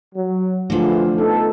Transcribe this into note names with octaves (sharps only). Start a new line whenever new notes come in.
F#3
E2 D3 E3 F3 A3 F4
B3 D#4 A4